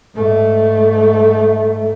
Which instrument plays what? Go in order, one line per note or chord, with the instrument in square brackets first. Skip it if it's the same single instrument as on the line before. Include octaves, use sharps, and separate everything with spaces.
[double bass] G#2 A3